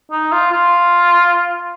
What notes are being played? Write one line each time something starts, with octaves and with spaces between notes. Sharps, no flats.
D#4
F4
F4